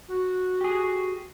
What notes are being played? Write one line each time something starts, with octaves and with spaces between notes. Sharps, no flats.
F#4
G4 G#4